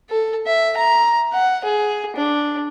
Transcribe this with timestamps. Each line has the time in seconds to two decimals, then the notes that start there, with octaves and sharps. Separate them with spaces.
0.10 A4
0.47 E5
0.78 A#5
1.33 F#5
1.65 G#4
2.16 D4